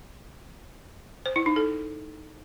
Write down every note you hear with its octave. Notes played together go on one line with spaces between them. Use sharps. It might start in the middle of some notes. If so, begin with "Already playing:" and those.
C5
E4
D#4
A4